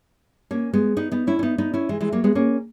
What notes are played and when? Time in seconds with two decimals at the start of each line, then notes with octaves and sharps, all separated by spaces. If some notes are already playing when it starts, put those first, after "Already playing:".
0.51 A#3 C#4
0.73 G#3 B3
0.97 B3 D#4
1.11 B3 D#4
1.27 C#4 E4
1.39 C#4
1.43 B3 D#4
1.58 B3 D#4
1.74 C#4 E4
1.89 E3 G#3
2.01 E3 G#3
2.12 F#3 A#3
2.24 G#3 B3
2.35 A#3 C#4